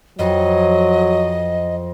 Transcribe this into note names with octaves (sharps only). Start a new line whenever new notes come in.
F2 F#3 D#5